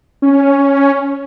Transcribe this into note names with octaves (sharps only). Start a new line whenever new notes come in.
C#4